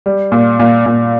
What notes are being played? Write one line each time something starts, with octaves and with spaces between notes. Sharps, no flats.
G3
A#2
A#2
A#2